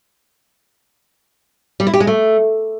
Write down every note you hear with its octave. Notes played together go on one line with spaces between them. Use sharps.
G3
E4
G4
G#3
A3